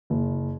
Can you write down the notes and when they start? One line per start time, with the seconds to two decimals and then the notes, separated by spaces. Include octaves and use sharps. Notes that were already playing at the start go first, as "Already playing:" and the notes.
0.10 F#1